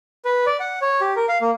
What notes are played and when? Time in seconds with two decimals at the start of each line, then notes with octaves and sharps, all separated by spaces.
0.25 B4
0.47 D5
0.60 F#5
0.82 C#5
1.01 G4
1.16 A#4
1.29 F5
1.41 A#3